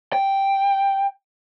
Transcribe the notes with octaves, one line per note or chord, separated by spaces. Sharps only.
G5